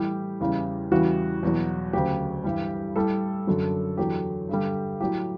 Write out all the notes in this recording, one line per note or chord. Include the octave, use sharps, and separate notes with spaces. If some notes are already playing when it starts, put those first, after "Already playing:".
Already playing: A2 E3 G3 G4
E2 C#3 E3 G3
E2 C#3 E3 G3 F#4
E2 B2 F#3
D2 C#3 F#3 G4
G2 E3 G3
A2 G3 A4
F#2 D3 F#3
E2 D3 F#3 G4
G2 D3 G3
A2 F#3 G4